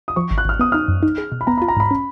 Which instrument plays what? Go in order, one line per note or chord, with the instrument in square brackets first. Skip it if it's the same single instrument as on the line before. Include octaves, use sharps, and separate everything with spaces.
[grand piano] D#6
[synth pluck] F3 [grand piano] C#6
[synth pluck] G#1
[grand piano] F#6
[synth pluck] G#1 [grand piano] F6
[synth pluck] B3 [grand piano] D#6
[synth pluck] D#4 [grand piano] F6
[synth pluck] F#2
D#4
G#4
B2
[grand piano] B5
[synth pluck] B3 [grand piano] A#5
[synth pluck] F4 [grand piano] B5
[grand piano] A#5
[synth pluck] G#2 [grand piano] B5
[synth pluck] C#4